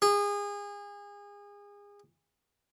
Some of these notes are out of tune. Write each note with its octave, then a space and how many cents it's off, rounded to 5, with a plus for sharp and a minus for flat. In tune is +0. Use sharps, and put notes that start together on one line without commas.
G#4 -30